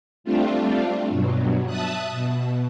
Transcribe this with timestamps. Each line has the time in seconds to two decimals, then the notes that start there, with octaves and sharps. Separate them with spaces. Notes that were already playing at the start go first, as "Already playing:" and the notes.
0.24 G3 A3 C4 D4 F4
1.09 G2 B2 F#3
1.66 E5 A5 D#6 F#6
2.11 B2